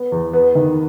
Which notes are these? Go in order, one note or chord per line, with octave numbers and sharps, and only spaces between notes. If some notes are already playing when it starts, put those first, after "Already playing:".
Already playing: B3
E2
B3
D#3